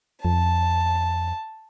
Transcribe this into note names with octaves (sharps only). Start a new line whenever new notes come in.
F2 A5